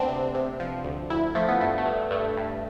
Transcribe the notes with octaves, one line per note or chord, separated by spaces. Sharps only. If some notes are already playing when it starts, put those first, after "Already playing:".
Already playing: D2 B3 C4 D4
C3
C3
F3
D2
D2 E4
F3 A3
B3
G2 A3
A3
G2
G2 A3
G2